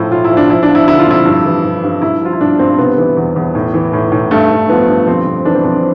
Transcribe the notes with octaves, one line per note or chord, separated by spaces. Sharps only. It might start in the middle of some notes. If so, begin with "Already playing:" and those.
Already playing: A2 F3 E4
A2 F4
E4
F3
D4
F3 E4
D4
F3
E4
D3 E4
F4
F2 E4
G2
E3
G2
G2
G2 E4
F3 F4
E4
G2 D4
G2 C4
C3 B3
E3
E2
E2
A2
E3
A2
A2
G2 A3
G2
F3 B3
G2
F2 C4
F2
E3 D4
C4
F2 D4